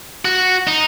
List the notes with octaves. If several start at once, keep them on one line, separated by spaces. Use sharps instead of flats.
F#4
D#4